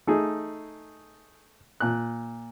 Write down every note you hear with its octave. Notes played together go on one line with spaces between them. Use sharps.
A3 D#4 G#4
A#2 F#6